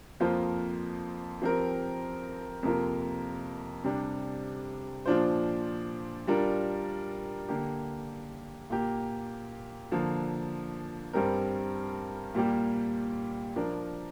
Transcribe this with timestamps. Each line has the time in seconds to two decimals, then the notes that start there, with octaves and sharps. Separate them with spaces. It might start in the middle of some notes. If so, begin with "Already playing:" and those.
0.20 F2 F3 A#3 F4 C5
1.42 F3 C4 G4 A#4
2.63 F2 C3 A#3 F4 A#4
3.84 C3 G3 D4
5.06 A#2 F3 D4 F4 C5
6.27 G3 D4 F4 A#4
7.48 D3 A#3 G4
8.70 A#2 A#3 G4
9.92 D3 F3 A#3
11.13 G2 G3 C4 A#4
12.35 A#2 G3 A#3 G4
13.56 F3 D4 A#4